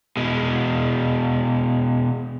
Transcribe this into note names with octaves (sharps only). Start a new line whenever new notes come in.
B2 G#3